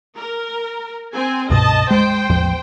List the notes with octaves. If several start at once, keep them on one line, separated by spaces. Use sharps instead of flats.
A#4
C4 G#5
C#2 G2 B2 D#5 A5
G#3 C5 G5
A1 E2 F3